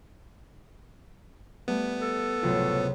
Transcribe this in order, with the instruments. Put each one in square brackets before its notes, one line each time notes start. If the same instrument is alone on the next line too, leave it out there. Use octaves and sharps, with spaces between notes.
[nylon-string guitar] G3 A3 [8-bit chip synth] B3
[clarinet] A4
[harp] C#2 C3 F#3 [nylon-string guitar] A2 F4